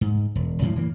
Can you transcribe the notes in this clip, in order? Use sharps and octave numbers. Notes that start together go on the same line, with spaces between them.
G#2
E1
F#2 A2 E3 F3
E3 A#3